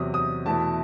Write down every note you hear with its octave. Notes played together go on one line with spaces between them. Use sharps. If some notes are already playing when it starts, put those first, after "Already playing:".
Already playing: E2 C3 F#3 D#6
D#6
E2 B2 A3 E4 A5